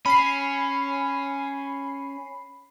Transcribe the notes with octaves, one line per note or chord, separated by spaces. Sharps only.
C#4 B5 C7